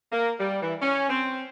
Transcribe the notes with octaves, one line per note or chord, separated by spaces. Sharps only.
A#3
G3
E3
C#4
C4